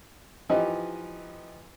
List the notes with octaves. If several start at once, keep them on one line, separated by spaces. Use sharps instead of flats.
E3 F3 D#4 G4 B4 D#5